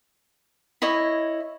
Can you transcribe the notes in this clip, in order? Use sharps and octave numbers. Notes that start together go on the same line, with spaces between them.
E4 C#5 D#5